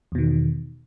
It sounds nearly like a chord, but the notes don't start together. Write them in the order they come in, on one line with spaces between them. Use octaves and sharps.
E2 B2 D#3